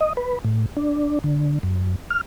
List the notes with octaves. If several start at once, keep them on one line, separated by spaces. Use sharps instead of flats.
D#5
B4
A2
D4
D3
F#2
F6